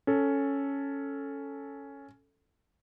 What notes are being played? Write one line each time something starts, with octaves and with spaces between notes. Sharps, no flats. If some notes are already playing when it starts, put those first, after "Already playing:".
C#4 A4